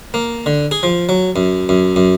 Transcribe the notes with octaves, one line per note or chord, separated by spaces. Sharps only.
A#3
D3
G#4
F3
F#3
F#2
F#2
F#2